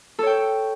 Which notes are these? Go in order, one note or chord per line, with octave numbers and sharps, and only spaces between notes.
A4 C#5 G5